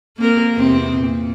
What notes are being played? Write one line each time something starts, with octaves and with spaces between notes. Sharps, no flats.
A#3 C4 A#4
E2 C3 C4
A#2